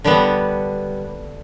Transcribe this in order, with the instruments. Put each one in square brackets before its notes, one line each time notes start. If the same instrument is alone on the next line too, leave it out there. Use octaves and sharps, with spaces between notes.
[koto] D3 G3 B3